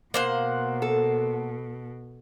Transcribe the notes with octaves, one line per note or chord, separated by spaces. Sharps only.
B2 A#3 C5 F#5
A4